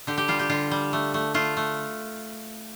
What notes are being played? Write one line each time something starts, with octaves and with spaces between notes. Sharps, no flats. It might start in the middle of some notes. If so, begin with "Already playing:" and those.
D3 G4
G4
G3 F4
G4
D3 F4
G3
A3
A3
A3 F4
A3